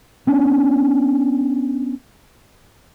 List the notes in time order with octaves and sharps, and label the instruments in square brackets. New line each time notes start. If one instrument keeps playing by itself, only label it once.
[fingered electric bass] B3 C#4 D4